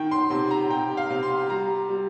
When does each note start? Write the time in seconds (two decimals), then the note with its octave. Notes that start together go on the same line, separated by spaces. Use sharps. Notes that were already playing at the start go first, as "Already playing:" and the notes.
Already playing: D#3 G5
0.11 C6
0.30 C3 C6
0.51 A#5
0.70 C3 G5
0.97 F5
1.10 C3
1.23 C6
1.49 G3 A#5
1.89 G3